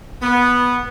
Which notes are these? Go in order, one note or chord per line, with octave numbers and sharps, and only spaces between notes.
B3